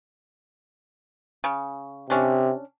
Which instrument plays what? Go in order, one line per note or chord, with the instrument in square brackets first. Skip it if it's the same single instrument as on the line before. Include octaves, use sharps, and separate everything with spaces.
[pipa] C#3
[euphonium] C3 [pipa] C#4 D4